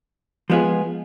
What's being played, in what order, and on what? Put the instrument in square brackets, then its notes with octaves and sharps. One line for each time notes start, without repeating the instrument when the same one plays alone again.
[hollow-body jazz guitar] F3 G#3 B3 F4 G#4